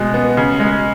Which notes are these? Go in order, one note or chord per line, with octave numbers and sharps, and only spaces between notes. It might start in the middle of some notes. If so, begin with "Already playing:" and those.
Already playing: B2 G#3
B3
C#3
G#3